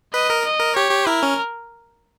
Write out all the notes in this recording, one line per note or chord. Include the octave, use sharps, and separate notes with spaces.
B4 D#5
A#4
D#5
A#4
G4 C#5
G4
E4 A#4
C#4